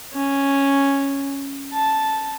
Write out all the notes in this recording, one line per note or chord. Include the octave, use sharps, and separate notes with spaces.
C#4
A5